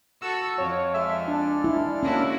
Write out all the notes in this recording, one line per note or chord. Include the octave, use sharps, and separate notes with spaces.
F#4 A4 E6
F2 C#5
G#3 A4 E5 F6
D4
E4
A#3 C#4 E4 F#4